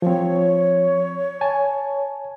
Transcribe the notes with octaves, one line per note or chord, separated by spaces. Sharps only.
F3 C4 C#5
G#5 A5